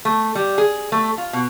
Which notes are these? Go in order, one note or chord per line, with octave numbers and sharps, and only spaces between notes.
A3
G3
G#4
A3
F4
B2